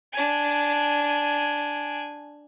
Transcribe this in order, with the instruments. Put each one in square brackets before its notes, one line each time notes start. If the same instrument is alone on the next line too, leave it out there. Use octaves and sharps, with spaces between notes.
[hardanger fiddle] D4 G#5